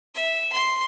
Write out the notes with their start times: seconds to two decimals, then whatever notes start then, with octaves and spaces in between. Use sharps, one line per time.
0.15 E5
0.53 C6